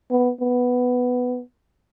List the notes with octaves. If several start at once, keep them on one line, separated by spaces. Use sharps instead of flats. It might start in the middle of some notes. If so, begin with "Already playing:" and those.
B3
B3